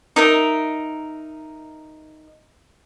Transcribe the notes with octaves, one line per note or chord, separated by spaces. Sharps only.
D#4 A#4 E5